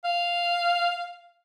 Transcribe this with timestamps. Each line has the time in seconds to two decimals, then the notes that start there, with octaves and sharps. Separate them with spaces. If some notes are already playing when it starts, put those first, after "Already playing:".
0.04 F5